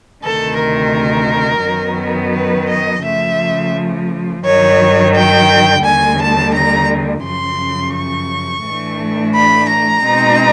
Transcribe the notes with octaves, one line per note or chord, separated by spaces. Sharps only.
D2 C3 D#3 A4
A#4
F#2 D#3 F#3 B3
B4
D#5
C#3 F3 A3 E5
G2 D#3 F#3 C#5
G5
D#2 D3 G3 G#5
A5
A#5
F#2 C#3 F3 C6
C#6
A2 E3 A3 D4
B5
A#5
B2 G#3 C4 D#4